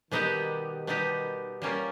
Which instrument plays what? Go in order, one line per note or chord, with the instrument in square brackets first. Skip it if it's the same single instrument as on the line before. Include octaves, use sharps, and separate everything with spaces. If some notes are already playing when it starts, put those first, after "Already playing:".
[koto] B2 G3 B3 D#4 G4 [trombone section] D#3
[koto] B2 G3 B3 D#4 G4
G3 A#3 C#4 F4 A#4